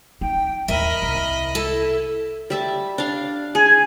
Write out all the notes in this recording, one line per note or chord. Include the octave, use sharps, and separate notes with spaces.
D#4 G5
D#2 A2 A#4 D#5 E5 B5
C2
E4 A4 A5
G3 E5 A5
D4 F5
G#4 G#5